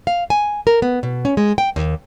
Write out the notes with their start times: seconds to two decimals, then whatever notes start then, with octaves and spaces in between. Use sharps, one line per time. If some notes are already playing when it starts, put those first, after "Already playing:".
0.07 F5
0.30 G#5
0.67 A#4
0.82 B3
1.03 B2
1.25 C#4
1.37 G#3
1.58 G5
1.76 D#2